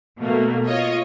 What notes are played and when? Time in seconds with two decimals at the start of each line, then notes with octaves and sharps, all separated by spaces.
0.20 B2 A3 A#3
0.66 F4 C#5 D#5